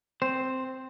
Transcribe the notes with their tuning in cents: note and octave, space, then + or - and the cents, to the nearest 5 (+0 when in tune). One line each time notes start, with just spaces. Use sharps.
C4 -5 C5 +5